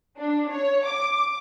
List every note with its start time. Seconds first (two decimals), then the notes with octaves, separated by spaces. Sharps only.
0.18 D4
0.51 C#5
0.86 D6